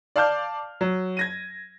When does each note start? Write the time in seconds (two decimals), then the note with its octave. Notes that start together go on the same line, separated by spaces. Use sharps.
0.16 D5 F5 A5 D6 F6 G6
0.81 F#3
1.17 G#6 A#6 D#7